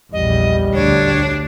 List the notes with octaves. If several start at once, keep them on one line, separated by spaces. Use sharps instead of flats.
A#1 E2 G3 D#5
D2 D4 C#5